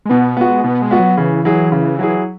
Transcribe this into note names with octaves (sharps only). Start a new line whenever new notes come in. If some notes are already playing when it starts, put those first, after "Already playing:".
G#3
B2 B3
G#3 B3 F#4
B2 B3
G#3
B3 F#4
F#3
C#3 E3
F#3 E4 G#4
C#3
F#3 E4 G#4